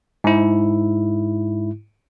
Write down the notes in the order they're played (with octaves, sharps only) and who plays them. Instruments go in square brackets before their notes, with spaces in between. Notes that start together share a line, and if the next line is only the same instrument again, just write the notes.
[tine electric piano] G#2 E4